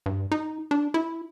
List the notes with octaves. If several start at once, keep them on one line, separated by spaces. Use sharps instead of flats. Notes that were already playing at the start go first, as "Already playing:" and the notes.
G2
D#4
D4
E4